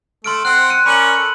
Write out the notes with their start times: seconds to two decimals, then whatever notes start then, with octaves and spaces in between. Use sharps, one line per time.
0.24 A3 C6 F6 D7
0.45 C4 F#5 F#6
0.70 F#6 C#7 D#7
0.86 C#4 A#4 D5 B5 F#7
1.17 A4